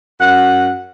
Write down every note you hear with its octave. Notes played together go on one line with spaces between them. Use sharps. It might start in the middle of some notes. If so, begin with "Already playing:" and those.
F#2 F#5